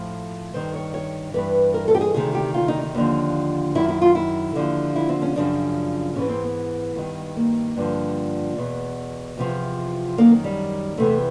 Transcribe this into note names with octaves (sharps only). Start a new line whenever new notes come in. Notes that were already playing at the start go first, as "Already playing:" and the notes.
Already playing: A2 F3
G2 D#3 C5
C#5
C#5
G2 E3 B4
A#4
A4
G4
G#4
D2 C3 D#3 G#4
G4
F4
D#4
D#4
D#2 D3 F3
F#2 D#3 E4
E4
F4
E4
D#2 D3 F3
E4
C4
C#4
F#2 C#3 F3 D4
G#2 E3 C#4
C4
B3
G2 D#3
A#3
G2 D3 F3
E2 B2
E2 C3 F3
F#2 D#3 A#3
G3
E2 C3 E3 A3